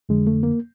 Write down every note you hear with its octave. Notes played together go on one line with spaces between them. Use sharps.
F2 D3 G#3
A3
A#3